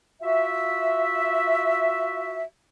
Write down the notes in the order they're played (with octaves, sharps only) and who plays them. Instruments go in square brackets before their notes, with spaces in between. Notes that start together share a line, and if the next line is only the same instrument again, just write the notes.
[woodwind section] F4 F#4 E5